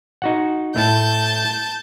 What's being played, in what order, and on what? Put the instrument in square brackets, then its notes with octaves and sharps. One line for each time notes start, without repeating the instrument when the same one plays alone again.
[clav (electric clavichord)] D#4 F#4 F#5
[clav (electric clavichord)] A2 A3 [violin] A5 G6